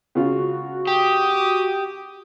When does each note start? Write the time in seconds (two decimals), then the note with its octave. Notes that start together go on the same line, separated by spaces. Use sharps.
0.15 C#3 F4 F#4
0.87 G4 D#6